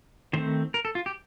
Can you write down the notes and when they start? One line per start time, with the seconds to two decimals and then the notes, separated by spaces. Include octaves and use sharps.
0.33 D#3 A3 C4 C5
0.74 A#4
0.85 A4
0.95 F4
1.06 G4